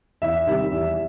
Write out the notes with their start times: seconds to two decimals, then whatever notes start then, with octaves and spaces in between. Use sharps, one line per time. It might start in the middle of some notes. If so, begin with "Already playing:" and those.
0.22 E2 E5
0.47 C3 D#3 G3
0.71 E2